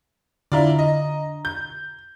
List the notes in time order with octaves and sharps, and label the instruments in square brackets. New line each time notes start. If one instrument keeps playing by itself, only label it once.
[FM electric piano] D3 A#5 [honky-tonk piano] E4 F4 D5
[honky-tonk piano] D#5
G6